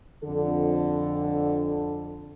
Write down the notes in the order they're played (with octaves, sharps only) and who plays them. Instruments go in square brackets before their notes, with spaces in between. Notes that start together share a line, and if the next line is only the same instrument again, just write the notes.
[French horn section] F2 D3 A4